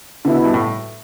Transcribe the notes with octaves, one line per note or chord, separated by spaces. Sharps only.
B2 D3 B3 E4
G2
A2